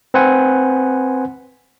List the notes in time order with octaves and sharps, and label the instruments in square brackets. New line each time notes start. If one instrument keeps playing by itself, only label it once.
[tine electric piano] C4 B4 C5 F#5 G#5